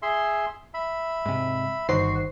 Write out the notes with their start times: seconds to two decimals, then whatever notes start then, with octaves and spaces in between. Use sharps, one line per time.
0.02 G#4 E5 C6
0.74 E5 B5
1.26 G#2 C3
1.89 G1 D#3 F#4 C5 C7